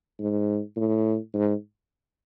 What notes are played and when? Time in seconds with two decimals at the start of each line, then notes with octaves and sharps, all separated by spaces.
0.20 G#2
0.76 A2
1.34 G#2